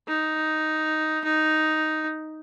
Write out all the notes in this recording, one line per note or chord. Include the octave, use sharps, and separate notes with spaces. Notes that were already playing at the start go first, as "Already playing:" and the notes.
D#4
D#4